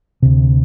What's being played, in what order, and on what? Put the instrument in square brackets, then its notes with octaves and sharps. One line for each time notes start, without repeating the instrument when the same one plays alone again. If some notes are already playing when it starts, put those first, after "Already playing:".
[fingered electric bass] D2 C3